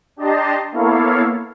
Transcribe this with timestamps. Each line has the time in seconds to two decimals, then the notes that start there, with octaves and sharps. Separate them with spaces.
0.16 D4 G4 D#5 A5 A#5 C6
0.72 A#3 B3 E4 A4 C#5 F5